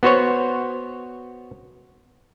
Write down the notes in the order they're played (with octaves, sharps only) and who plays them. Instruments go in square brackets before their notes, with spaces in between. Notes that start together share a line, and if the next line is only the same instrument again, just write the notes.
[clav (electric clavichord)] B3 F#4 C5 C#5